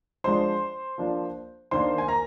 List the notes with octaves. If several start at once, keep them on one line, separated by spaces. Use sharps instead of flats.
F3 G#3 D4 C5 C6
F3 A#3 D4
D#3 A#3 D4 C5 C6
G#5
A#4 A#5